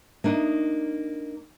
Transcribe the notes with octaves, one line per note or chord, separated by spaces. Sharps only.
A#3 D4 D#4